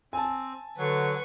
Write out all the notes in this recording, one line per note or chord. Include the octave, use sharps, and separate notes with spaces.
C4 G#5 A5
D3 F#3 B4 C#6